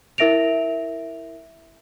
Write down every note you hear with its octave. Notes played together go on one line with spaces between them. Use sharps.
E4 A#4 E5 A#6 D7 F7